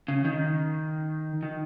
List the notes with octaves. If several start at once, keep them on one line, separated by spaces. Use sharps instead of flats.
C#3
D#3
D#3